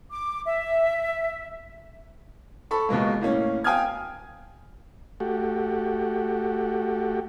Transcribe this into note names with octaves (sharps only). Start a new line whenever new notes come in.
D6
E5
A4 B5 C#6
C#2 B2 G#3 A#3
A2 A#3 C#4
F5 G5 G#5 D#6 F6 G#6
A3 F#4 G4